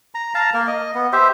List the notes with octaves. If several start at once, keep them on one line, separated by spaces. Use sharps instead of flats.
A#5
F5 A5 A#5
A#3 A#4
D#5
B3
G4 C5 E5